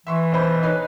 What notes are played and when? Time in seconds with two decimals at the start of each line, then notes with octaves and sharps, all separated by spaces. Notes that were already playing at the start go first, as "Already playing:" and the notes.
0.07 E3 E5 C6 C#6
0.32 B1 C5 B5
0.63 D#4 B4 C#5